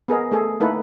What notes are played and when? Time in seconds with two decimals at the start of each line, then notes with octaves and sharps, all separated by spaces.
0.08 B3 G#4 A#4 D#5
0.31 A3 G#4 A4
0.60 A3 A#3 D#4 E4 A4 B4